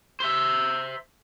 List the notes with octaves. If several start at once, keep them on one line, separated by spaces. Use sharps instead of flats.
C5 E5